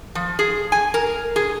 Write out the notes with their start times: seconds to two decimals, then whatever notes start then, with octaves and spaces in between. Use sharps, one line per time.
0.15 F3
0.39 G#4
0.72 G#5
0.94 A#4
1.36 G#4